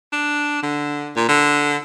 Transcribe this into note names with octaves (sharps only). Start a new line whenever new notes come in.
D4
D3
A#2
D3